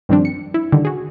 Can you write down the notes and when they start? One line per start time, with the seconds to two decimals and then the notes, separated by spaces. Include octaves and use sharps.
0.09 G2 D#3 F3 G3 C4 D4
0.25 C#7
0.54 E4
0.72 D3 D#3 G3
0.85 F#4 G#4